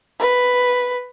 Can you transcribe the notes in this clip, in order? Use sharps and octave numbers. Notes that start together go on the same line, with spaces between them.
B4